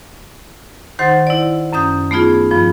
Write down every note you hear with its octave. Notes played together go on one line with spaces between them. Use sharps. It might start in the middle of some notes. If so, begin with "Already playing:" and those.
D#3 D#4 C5 F#5 C6 A6
E4 D5
F#2 C#4 D#6 G6
A3 B3 D#4 F4 G#4
G2 F3 F4